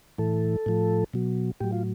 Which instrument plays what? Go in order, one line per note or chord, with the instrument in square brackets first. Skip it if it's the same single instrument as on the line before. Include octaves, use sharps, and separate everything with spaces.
[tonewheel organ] A2 E3 A4
A2 F3
B2 F#3
A2 F#3 G4
F4